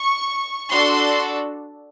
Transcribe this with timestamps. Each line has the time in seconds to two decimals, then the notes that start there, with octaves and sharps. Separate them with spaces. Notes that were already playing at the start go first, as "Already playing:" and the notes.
Already playing: C#6
0.72 D4 F#4 A4 C6